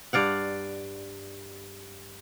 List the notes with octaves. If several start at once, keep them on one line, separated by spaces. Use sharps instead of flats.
G2 D5 F5 F#5